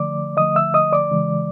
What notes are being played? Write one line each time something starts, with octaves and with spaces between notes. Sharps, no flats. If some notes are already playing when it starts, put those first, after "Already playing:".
Already playing: D3 F3 A3 D5 D6
D3 F3 A3 D#5 D#6
E5 E6
D#5 D#6
D5 D6
C#3 E3 G#3